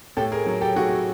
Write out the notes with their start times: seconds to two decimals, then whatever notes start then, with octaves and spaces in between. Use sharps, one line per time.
0.17 A2 G4 A4
0.32 G#4 A#4
0.47 F#3
0.61 G4 A4
0.76 A2 F#4 G#4